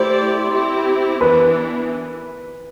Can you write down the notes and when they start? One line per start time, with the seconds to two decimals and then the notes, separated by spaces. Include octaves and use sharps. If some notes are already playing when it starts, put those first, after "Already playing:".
Already playing: A3 E4 G4 C5 D5
0.51 C4 E4 G4
1.20 E3 B3 D4 B4